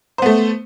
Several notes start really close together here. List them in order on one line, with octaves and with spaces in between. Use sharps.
C5 B3 A3